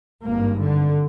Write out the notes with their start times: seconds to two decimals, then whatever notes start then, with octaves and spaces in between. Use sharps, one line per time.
0.24 G#1 G2 A#3
0.60 D3